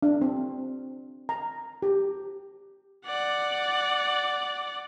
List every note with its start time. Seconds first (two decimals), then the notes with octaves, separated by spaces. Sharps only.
0.03 D4
0.22 C4
1.29 A#5
1.82 G4
3.06 D5 F#5